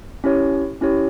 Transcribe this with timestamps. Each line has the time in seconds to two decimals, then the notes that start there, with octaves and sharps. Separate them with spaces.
0.24 C#4 E4 G4 C#5
0.81 C#4 E4 G4 C#5